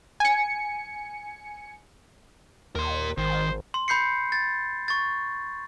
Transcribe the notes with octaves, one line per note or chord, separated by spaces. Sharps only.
G#5 C#7
D#2 A#4 C6
G#1 D#3 C5
C6
B5 G6 C7 C#7
A6
C#6 A6